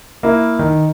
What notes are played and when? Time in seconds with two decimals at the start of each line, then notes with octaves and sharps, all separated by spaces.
0.23 A#3 E4
0.59 D#3